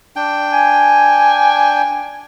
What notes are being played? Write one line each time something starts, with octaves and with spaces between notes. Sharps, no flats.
D4 G5
G#5